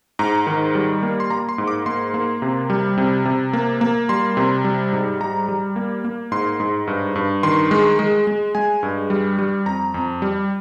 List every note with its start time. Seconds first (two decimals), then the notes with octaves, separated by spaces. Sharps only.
0.19 G#2 A#5
0.47 D#3
0.75 G3
1.03 A#3
1.20 C6
1.30 A#3 A#5
1.49 C6
1.58 G#2
1.68 D6
1.86 A#3 C6
2.14 A#3
2.42 C3
2.70 G3
2.98 C3
3.25 C3
3.53 A#3
3.81 A#3
4.09 G3 C6
4.37 C3
4.64 G3
4.92 G#2
5.20 G3 A#5
5.48 G3
5.76 A#3
6.04 A#3
6.32 G#2 C6
6.60 G#2
6.87 G2
7.15 G2
7.43 D#3 C6
7.71 G#3
7.99 G#3
8.27 G#3
8.55 G#3 G#5
8.83 G2
9.10 G3
9.39 G3
9.66 F2 A#5
9.94 F2
10.22 G3